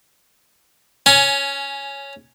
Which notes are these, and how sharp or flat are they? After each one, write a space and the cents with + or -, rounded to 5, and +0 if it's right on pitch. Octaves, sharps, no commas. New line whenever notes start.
C#4 +0 G#5 +20